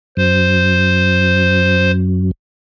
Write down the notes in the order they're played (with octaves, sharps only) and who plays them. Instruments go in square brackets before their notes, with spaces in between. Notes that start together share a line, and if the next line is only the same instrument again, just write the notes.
[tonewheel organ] F#2 [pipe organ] C5